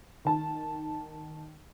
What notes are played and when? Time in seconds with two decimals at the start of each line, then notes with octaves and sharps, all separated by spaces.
0.25 D#3 A5